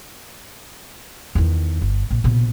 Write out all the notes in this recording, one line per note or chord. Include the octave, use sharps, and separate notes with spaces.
E2 D#3
G1
A#1
A#1 B2